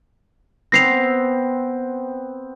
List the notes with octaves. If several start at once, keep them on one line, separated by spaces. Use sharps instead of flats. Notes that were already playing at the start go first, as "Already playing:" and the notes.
B3 C4 A#6 C7 F7